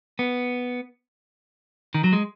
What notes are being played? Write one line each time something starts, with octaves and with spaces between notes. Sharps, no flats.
B3
D#3
F#3
G#3